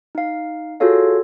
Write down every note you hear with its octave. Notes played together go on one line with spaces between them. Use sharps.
D#4 F5
F4 F#4 G#4 A4 C#5 F5